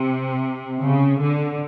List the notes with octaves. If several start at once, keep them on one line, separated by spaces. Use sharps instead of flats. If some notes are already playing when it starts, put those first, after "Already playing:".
Already playing: C3
C#3
D3